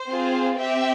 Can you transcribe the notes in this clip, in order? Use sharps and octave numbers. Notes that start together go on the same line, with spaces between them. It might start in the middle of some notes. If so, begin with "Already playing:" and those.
Already playing: C5
C4 F4 G#4
C4 G4 E5 G5